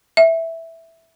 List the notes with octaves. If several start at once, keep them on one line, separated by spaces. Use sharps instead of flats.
E5